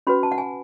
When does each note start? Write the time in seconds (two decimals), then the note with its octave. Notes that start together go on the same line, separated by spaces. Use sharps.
0.07 C#4 F#4 B4 B5
0.23 A5
0.32 F#5
0.38 G#5